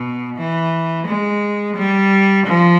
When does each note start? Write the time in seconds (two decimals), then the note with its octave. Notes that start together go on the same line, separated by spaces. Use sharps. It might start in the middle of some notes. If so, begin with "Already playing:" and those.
Already playing: B2
0.36 E3
1.07 G#3
1.76 G3
2.46 F3